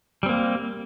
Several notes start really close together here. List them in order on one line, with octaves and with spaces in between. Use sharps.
G3 C4 A#3